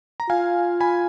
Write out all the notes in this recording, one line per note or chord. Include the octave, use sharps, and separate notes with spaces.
A#5
F4 F5 G#5
G#5 B5